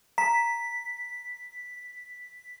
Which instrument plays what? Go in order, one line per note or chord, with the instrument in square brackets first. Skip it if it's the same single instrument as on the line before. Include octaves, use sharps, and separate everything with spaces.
[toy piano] A#5 [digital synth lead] B6